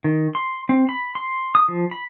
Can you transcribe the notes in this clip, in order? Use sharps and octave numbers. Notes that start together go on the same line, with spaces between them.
D#3
C6
C4
B5
C6
D#6
F3
B5